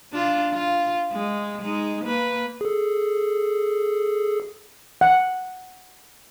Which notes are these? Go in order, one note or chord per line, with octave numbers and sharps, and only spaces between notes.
D4 F4
F4
G#3
G#3 D#4
A#3 B4
G#4 A4
F#5